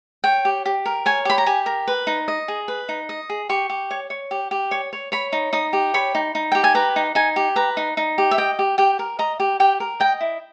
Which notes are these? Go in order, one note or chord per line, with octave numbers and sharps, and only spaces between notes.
C#5 G5
G4
G4
A#4
C#5 G#5
G4 B5
A#5
G4 G#5
A#4
B4
D#4
D#5
G#4
B4
D#4
D#5
G#4
G4 C#6
G4
C#5
C#5
G4
G4
C#5
C#5
C#5 B5
D#4
D#4 D#6
G4
C#5 B5
D#4
D#4
G4 G5
G#5
B4 A#5
D#4
D#4 G#5
G4
B4 A#5
D#4
D#4
G4
E5
D#5 G5
G4
G4 G5
A#4
D#5 A#5
G4
G4 G5
A#4
D#5 G5
E4